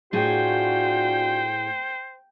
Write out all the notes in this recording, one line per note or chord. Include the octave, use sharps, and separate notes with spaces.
A2 D4 F4 F#4 G#4 C5 G5